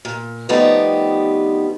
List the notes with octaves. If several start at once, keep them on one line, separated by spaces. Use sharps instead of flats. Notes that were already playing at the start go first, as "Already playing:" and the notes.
A#2
F3 G3 A3 B3 D#4 G4